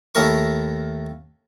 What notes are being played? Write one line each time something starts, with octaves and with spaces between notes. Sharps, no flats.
D#2 A3 E4 A#4 C#6